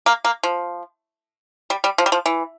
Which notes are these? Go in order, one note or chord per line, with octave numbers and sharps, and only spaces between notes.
A#3
A#3
F3
G3
G3
F3
G3
F3
E3